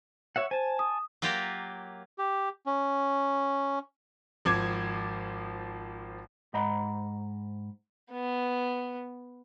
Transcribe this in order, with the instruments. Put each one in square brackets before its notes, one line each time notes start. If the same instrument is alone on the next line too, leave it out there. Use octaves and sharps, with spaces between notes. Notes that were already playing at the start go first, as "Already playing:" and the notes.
[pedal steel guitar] C#5 E5 F#5
[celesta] C5 [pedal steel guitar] G#5 A5
[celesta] D#6
[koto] F#3 A#3 F4 G4
[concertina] G4
C#4
[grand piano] G#1 F3 D6 G#6
[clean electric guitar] G#2 C5 D#5 F#5 A#5 B5
[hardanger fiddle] B3